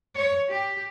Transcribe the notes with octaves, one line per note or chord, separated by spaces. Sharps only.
C#5
G4